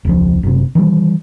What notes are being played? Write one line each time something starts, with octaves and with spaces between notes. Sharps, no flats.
E1 C#2 F3
F#1 C3
D#3 E3 F#3 G3